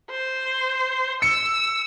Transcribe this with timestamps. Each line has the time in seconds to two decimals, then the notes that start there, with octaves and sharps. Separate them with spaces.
0.11 C5
1.22 E6 C#7